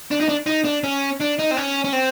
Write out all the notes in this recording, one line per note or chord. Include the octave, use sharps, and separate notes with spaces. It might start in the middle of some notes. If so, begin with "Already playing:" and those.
D4
D#4
D4
D#4
D4
C#4
D4
D#4
C4
C#4
C#4
C4